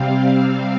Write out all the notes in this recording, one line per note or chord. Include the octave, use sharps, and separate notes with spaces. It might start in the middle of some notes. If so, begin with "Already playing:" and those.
Already playing: C3 G3 C4 F5
F5